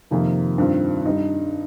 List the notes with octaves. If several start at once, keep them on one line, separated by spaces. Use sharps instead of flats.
F2 C3 D#3 A#3 F4
G2 D#3 C4 F4
G2 G3 D#4